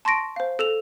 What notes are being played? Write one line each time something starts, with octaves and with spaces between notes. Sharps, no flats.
A5 C6 C#6 A#6 D7
C5 F5
A4 E7 F7